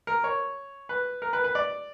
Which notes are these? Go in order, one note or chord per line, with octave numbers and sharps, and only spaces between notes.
A#4
C#5
B4
A#4
B4
B4
D5